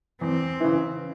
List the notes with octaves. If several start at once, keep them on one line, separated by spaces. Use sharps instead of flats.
E2 C4
C#3 E3